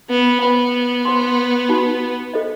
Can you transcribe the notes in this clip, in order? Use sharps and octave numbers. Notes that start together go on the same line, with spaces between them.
B3
B3 C5 F#5 B5
C5 F#5 C6
D#4 F#4 B4 F#5 B5
A4 C5 D#5